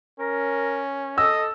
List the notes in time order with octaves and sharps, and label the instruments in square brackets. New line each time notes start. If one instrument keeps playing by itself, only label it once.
[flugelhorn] C#4 [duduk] A#4
[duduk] A4 [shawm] D#5 [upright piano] E6